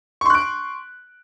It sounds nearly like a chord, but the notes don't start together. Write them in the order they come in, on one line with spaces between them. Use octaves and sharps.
C#6 C6 F#6 D7